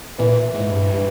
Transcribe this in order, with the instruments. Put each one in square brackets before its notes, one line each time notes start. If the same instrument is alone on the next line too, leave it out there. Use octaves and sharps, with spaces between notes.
[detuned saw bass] A#2 [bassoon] E3
[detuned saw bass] G#2
G2